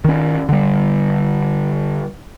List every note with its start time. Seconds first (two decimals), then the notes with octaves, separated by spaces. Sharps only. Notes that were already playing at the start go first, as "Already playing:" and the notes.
0.05 D#3 C#4
0.49 D3 G3